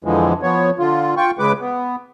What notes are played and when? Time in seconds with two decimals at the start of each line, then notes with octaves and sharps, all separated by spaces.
0.04 F2 D3 E3 F3 G#3
0.42 F3 B3 C#5
0.79 D3 F4
1.17 F4 G5 C#6
1.39 C#3 G#3 B4 D6
1.60 B3